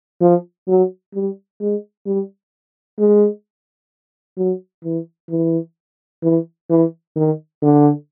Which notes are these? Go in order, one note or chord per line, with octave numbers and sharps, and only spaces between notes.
F3
F#3
G3
G#3
G3
G#3
F#3
E3
E3
E3
E3
D#3
D3